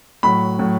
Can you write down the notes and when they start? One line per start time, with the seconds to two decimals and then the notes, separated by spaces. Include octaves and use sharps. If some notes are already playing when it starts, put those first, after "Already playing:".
0.23 A2 F#3 B5
0.59 A2 F#3